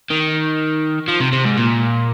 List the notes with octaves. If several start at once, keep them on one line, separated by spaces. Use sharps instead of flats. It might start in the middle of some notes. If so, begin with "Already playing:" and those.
D#3
F3
C3
C3
G#2
A#2